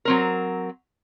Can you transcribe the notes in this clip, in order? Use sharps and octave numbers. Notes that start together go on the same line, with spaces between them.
F#3 C4 A#4